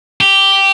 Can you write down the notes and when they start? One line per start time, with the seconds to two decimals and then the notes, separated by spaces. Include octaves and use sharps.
0.21 G4